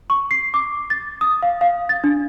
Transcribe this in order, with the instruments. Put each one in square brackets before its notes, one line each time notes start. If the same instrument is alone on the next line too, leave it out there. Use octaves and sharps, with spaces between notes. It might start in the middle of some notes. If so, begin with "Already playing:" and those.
[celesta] C#6
C7
D6
A6
D#6
F5
F5
A6
D4